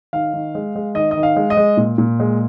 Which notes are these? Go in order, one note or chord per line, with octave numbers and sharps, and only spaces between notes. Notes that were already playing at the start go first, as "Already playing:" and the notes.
D#3 F5
D#3
G#3
G#3
D#3 D#5
D#5
D#3
F5
G#3
D#5
G#3
A#2
A#2
G#3